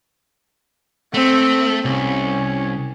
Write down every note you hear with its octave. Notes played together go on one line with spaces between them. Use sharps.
A3 C4
C2 C#4